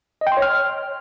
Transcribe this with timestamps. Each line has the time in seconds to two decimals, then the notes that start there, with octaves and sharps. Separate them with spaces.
0.21 D#5
0.27 G5
0.32 C6
0.37 C#5
0.42 F6